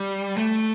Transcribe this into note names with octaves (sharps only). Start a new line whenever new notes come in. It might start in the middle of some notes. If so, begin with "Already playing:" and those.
Already playing: G3
A3